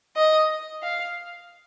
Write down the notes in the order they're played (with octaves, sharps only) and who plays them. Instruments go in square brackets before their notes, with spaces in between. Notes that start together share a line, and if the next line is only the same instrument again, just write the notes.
[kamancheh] D#5
F5